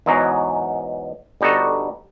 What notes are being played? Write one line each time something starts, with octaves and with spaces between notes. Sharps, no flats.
E2 G#2 B2 F#3
G1 G3 D#4 F#4 A4